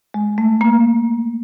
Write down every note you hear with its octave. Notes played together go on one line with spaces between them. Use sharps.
G#3
A3
A#3